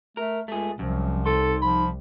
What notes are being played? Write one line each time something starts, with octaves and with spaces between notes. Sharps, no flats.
A3 A#4
C#2 A3 G#4
C2 F#2 F3
D#4 A4 C6
F3 B5